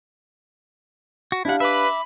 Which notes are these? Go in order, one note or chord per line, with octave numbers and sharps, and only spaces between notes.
F#4
D4 E4 G4 F5 F#5
B4 E5 B5 D6